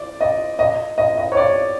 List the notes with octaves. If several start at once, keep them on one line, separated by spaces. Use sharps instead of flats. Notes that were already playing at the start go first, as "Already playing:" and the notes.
Already playing: D5
D#5
D#5
D#5
D#5
C#5
D5